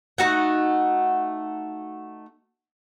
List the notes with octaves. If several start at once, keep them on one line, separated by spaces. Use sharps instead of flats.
A3 D#4 F#4 F#5